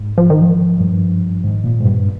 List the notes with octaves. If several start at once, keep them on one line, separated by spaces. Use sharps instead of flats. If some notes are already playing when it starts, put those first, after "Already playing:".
Already playing: G#2
F3
D#3
F3
G2
G#2 D#3
A#2
G#2
G2